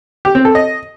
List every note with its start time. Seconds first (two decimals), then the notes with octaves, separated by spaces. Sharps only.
0.25 G4
0.35 C4
0.45 A4
0.55 D#5